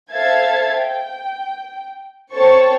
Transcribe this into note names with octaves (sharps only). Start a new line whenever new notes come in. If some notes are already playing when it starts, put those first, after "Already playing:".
A4 C5 E5 F5 A5 G#6
G5
C4 A4 C5 C#5 A5 C#6